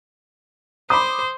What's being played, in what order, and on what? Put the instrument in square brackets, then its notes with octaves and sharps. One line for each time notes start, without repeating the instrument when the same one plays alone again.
[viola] C5 [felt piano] B5 D6 D#6